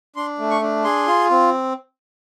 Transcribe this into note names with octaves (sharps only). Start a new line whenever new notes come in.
D4 C6
A3
C#6
D4
G#4 C6
F4
C4